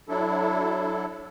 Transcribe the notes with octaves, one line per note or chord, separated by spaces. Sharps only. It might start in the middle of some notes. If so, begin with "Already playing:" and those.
F#3 D4 E4 A4